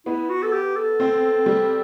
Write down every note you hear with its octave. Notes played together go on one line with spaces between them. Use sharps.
B3 E4
F#4
A4
G4
A4
C4
G3